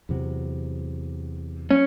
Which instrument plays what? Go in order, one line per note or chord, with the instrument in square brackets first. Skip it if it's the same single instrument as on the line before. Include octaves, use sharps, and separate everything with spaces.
[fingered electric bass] E2 C3 F#3
[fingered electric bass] F#3 [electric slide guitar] C#4